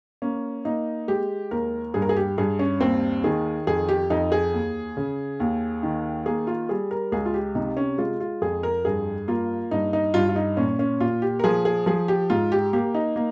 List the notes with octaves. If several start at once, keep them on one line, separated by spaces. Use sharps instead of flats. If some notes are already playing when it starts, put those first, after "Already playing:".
A#3 C#4
A#3 D#4
G#3 G4
D#2 A#4
G2 G#4
A#4
G#4
G4
G2 G#4
C#4
D#2 C4
D#3 G#4
F2 G#4
G4
F2 D#4
G#4
D#2
C#3
D#2
D#3
A#3 G#4
F4
G3 G#4
A#4
C#2 G#4
F4
G4
C3 D#4
C#4
G#3 F4
F4
F2 G#4
A#4
G2 G#4
A#3 F4
G2 D#4
D#4
G2 F4
F4
D#4
A#2 C#4
C#4
A#2 F4
G4
A#4
F3 G#4
G#4
F3 G#4
G4
G#2 F4
G4
A#3 G4
D#4
A#3